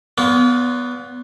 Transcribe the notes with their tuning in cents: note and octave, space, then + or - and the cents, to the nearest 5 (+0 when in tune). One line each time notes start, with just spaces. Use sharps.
B3 +0 F4 +30 D5 -45